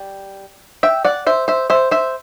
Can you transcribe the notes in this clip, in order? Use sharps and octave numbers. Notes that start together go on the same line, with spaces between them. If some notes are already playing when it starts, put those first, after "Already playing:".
Already playing: G3
E5 G5
D5 F#5
C5 E5
C5 E5
C5 E5
C5 E5